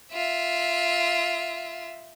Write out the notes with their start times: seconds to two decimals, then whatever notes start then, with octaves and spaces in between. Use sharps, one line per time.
0.12 F4 E5